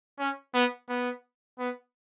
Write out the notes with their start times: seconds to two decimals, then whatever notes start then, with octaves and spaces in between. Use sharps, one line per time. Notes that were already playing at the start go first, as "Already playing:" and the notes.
0.19 C#4
0.54 B3
0.89 B3
1.59 B3